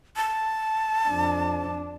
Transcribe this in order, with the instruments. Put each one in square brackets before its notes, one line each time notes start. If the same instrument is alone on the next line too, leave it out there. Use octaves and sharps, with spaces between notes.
[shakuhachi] A5
[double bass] F2 D4